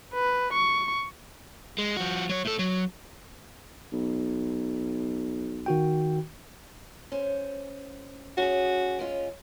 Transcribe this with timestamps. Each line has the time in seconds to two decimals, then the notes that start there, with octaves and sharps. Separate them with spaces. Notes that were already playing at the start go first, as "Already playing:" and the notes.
0.14 B4
0.53 C#6
1.78 G#3
1.97 F3 F#4
2.29 F#3 C#5
2.45 A2 A4
2.59 F#3
3.93 B1
5.66 D#3 F#4 G5
7.12 C#4 C5
8.38 C#4 F#4 G#4
8.99 G#3 C#4 F4